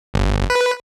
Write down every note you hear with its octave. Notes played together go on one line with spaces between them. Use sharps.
G1
B4